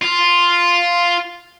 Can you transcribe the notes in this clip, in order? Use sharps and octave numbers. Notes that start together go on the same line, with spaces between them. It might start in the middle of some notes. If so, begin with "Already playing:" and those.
F4